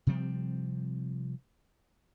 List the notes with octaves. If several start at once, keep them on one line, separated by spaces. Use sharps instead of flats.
C3 F3 G3 C4